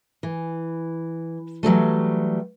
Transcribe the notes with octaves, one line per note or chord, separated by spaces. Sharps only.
E3
E3 F#3 G3 A3